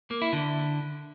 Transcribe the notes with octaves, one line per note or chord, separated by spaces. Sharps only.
A#3
E4
D3